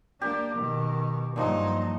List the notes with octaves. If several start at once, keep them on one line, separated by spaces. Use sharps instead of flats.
A#3 D4 G4
B2 D#3
G2 A#2 F3 F#3 D#4